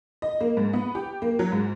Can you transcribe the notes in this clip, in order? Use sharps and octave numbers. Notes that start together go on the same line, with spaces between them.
D#5
A#3
G#2
B3
G4
A#3
F#3
G#2